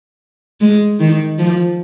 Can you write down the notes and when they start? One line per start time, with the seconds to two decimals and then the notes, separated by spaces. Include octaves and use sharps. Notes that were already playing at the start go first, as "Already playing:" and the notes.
0.61 G#3
1.00 D#3
1.39 F3